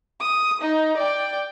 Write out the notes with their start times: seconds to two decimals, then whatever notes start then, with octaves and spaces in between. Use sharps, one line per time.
0.21 D#6
0.61 D#4
0.97 D5 G5